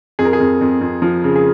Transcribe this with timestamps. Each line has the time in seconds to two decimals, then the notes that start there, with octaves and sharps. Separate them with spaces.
0.19 F2 G#4
0.25 A#4
0.33 G#4
0.40 F2
0.61 F2
0.81 F2
1.02 F3
1.24 C#3
1.36 G#4